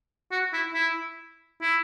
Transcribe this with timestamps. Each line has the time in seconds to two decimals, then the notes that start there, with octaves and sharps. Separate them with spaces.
0.32 F#4
0.54 E4
0.74 E4
1.62 E4